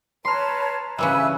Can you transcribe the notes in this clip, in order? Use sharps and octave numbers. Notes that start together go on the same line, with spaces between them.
B4 C#5 A5 A#5 C6 F6
C#3 E3 G3 E5 G#5 E6 F#6